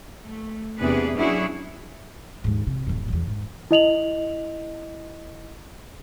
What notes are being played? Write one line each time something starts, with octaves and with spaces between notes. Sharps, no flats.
A3
E2 C3 B3 D4 G#4 B4
F#3 C#4 D4 E4 F#4 G#4
D#2 G#2
C3
D1 F#2
E2 F#3
G#2
E4 D#5 F7 F#7